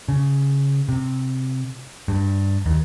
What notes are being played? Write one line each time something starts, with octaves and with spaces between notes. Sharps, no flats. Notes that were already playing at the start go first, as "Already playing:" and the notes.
C#3
C3
G2
D#2